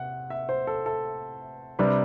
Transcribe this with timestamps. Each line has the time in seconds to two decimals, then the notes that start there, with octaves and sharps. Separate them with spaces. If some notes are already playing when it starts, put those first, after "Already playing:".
Already playing: C3 F#5
0.30 E5
0.49 C5
0.67 A4
0.86 A4
1.79 C3 G3 D4 B4